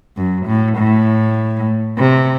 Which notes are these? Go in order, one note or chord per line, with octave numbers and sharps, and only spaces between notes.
F#2
A2
A2
C3